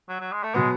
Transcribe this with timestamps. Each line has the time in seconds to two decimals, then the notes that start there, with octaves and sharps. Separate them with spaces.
0.09 F#3
0.20 F#3
0.32 G#3
0.43 A3
0.54 B2 F#3 G#3 B3